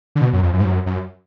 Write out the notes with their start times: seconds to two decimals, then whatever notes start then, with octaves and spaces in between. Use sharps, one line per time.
0.15 D3
0.21 B2
0.33 F#2
0.43 F2
0.53 F#2
0.60 G#2
0.64 F#2
0.86 F#2